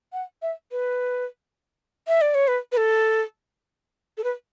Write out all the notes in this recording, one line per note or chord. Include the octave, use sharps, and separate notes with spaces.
F#5
E5
B4
E5
D5
C#5
B4
B4
A4
A4
B4